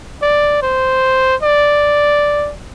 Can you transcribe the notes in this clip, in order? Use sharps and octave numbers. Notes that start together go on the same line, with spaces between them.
D5
C5
D5